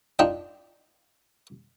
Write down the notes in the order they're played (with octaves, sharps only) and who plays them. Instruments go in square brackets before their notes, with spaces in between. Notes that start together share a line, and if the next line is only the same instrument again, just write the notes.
[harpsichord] D4 D#4 F4 G5